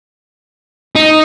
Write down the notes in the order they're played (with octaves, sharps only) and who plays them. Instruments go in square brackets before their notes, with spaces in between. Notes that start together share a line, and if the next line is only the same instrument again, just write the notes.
[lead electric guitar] D#4